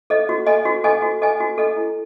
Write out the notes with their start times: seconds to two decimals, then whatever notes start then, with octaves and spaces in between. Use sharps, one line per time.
0.10 A4 D#5
0.29 F#4
0.47 A4 D#5 G#5
0.65 F#4
0.84 A4 D#5 G#5
1.02 F#4
1.22 A4 D#5 G#5
1.40 F#4
1.58 A4 D#5 G#5
1.76 E4